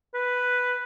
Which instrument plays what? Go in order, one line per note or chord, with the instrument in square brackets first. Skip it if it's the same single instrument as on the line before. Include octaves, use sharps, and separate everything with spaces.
[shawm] B4